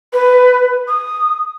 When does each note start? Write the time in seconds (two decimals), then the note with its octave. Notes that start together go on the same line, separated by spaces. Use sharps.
0.13 B4
0.88 D#6